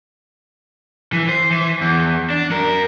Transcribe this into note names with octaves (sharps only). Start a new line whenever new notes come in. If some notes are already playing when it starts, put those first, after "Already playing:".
E3
C5
E3
E2
D4
F#2 A#4